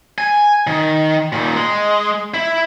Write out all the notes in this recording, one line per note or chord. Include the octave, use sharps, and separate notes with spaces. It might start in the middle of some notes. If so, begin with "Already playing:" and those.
G#5
D#3
A#2 D#3
G#3
E4